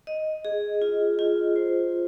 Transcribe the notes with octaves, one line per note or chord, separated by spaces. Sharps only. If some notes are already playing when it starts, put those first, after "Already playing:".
D#5
G#4
F4
F4
C5